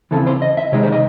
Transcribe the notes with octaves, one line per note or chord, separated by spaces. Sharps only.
D#2 C#3 E3 C4 E4 A4
C5
D#5
E5
C3 D#3 G#3 C#5
C5
D#5